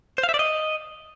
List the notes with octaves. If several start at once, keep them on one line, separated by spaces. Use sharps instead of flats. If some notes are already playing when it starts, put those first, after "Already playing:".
C5
F5
E5
D5
D#5